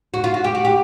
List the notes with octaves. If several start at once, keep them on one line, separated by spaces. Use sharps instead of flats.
F#4
F4
F#4
G4
F#4
G4